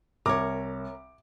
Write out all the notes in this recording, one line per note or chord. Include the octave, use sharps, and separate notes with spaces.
C2 A#4 C#5 D6